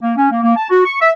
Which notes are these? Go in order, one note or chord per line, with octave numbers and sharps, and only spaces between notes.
A#3
C#4
A#3
A#3
A5
F#4
C#6
E5